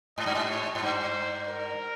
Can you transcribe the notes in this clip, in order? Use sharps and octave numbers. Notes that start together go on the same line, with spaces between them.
G#2 D#5
G2
G#2
C#5
G#2
G2 C5
A#4